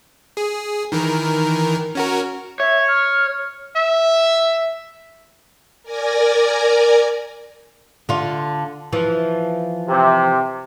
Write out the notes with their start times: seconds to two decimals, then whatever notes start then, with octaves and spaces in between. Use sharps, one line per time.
0.37 G#4
0.92 D#3 E3 A#4
1.95 C#4 F#4 A#4
2.60 C#5 E5
2.88 F6
3.76 E5
5.83 A#4 D5 G#5 A#5
8.09 D3 F4
8.93 E3 F3
9.89 C3